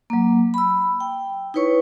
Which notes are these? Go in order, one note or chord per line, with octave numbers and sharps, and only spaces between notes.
F#3 A#3
B5 E6
G5
D#4 E4 B4 C#5 C#6